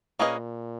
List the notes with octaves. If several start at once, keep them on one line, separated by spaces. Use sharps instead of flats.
A#2 A#3 C#4 G#4 B4 D#5